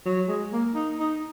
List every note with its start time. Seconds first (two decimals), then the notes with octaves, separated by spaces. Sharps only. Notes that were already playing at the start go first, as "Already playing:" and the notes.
0.05 F#3
0.28 G#3
0.52 A#3
0.75 D#4
0.99 D#4